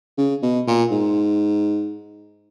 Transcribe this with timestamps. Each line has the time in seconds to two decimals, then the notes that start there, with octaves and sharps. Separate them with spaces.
0.18 C#3
0.43 B2
0.67 A#2
0.91 G#2